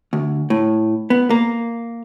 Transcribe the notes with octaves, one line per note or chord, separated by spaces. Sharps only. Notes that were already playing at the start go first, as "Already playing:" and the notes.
D2
A2
B3
A#3